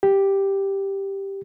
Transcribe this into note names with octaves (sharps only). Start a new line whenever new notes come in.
G4